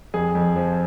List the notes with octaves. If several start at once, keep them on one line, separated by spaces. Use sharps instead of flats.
F2 G#4
F2
F3